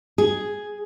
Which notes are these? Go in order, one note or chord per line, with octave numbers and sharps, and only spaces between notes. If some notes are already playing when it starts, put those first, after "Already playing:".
G#4